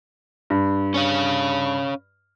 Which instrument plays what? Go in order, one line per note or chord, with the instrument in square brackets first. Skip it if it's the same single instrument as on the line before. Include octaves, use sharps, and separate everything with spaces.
[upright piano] G2
[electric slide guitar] C#4 C#5 F5